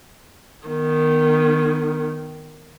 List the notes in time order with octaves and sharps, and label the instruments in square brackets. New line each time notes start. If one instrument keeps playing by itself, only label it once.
[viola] D#3 B3